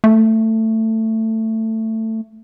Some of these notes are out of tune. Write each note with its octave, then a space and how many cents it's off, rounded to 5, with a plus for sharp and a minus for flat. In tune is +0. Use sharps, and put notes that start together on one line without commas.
A3 +15